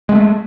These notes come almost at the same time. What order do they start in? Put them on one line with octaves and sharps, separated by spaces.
G#3 B3 A3